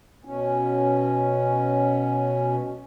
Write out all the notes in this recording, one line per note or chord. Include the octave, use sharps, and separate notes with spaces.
B2 C#4